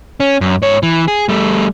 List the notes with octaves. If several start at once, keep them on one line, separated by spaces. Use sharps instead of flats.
C#4
F#2
G#2 C#5
E3
G#4
G3 A3